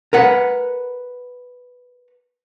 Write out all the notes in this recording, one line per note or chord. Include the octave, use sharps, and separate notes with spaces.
A#4 B4 F#5